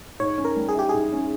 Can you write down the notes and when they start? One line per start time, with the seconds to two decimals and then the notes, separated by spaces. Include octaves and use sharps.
0.20 G#2 C#5
0.38 C#4
0.45 A#4
0.56 G3
0.69 G#4
0.75 E4 G4
0.89 G#2 G#4
1.12 C#4